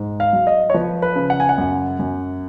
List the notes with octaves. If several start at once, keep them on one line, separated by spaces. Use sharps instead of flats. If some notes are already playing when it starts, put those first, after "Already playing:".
Already playing: G#2
F5
F#3
D#5
C#5
F3 B4
B4
C#3
F#5
G#5
F#5
F#2
F#2